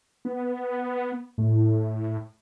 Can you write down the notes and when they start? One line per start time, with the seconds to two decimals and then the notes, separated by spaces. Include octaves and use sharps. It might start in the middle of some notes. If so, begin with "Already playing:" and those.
0.25 B3
1.38 A2